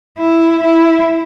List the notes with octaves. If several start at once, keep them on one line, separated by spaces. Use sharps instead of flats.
E4
E4